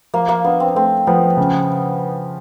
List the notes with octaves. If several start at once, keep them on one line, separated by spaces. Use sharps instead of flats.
F3 A#3
A#3
B3 D4
C4
A3 C4
F3 B3
C#3